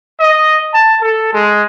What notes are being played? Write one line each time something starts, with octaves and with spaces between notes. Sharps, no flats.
D#5
A5
A4
G#3